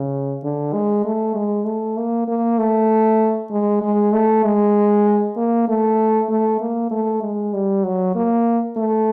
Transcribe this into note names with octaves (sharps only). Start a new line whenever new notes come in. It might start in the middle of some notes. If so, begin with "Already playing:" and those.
Already playing: C#3
D3
G#3
A3
G#3
A3
A#3
A#3
A3
G#3
G#3
A3
G#3
A#3
A3
A3
A#3
A3
G#3
G3
F#3
A#3
A3